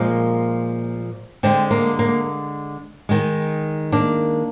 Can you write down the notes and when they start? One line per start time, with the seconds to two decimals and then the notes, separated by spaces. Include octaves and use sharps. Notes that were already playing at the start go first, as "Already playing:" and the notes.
Already playing: A#2 F3 G#3 A#3
1.43 D3 G#3 C4
1.71 A#3
1.99 A#3
3.09 D#3 G#3
3.92 A#3 D4